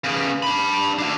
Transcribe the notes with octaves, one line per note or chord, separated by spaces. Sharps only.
C#3 B3
D4 B5
D4 F#4